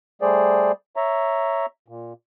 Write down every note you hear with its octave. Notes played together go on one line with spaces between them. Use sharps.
G3 A3 G#4 C5 D5
C#5 E5 A#5
A#2